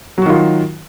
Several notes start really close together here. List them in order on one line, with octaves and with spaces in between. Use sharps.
F#3 F#4 D#3 F4